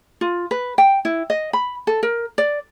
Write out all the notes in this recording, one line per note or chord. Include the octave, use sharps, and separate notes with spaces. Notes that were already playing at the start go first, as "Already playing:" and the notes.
F4
B4
G5
E4
D#5
B5
A4
A#4
D5